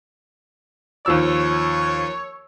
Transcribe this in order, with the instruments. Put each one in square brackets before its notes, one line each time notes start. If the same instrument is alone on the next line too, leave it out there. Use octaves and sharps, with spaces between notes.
[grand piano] D#2 F3 E6 [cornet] C#5